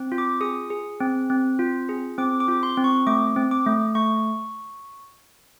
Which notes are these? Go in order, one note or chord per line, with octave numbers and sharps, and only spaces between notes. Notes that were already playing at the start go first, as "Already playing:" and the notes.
Already playing: C4
F4
D6
G#4 D#6
G#4
C4
C4
F4
G#4
C4 D6
D6
F4
C6
C4
C#6
A3 D6
C4
D6
A3
A3 C#6